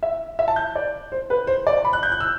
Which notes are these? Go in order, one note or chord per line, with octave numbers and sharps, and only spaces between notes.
E5
E5
A5
G6
D5
C5
B4
C5
D5
B5
F#6
G6
F#6
E6